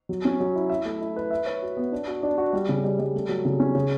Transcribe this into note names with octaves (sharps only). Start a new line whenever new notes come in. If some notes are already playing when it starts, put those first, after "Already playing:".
F#3
C#4
F#3
E4
E5
A3
E4
B4
E5
C#5
F#4
B3
D4
F#4
D4
F#4
G3
C#3
G3
G3
A3
F#3
C#3
C#4
C#3